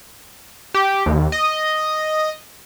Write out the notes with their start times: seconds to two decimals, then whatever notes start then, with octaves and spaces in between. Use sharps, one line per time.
0.74 G4
1.06 D#2
1.32 D#5